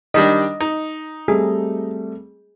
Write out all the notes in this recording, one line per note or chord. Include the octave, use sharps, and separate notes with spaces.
D#3 G3 D4 D#5
D#4
G3 A3 C4 G#4